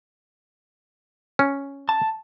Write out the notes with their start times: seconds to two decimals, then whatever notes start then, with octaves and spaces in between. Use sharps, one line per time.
1.39 C#4
1.89 A5